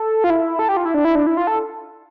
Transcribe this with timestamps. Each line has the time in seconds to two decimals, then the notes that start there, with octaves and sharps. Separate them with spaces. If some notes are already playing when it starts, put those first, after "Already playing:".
Already playing: A4
0.24 F4
0.30 E4
0.59 A4
0.69 G4
0.77 F4
0.85 E4
0.94 D4
1.05 E4
1.15 D4
1.27 E4
1.37 F4
1.47 A4